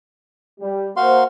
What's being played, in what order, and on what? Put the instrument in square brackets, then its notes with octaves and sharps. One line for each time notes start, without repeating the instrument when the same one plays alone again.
[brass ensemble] G3
[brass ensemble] A#3 C5 [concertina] F#4 F5 C6